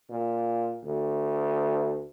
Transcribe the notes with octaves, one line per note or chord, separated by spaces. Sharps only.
A#2
D2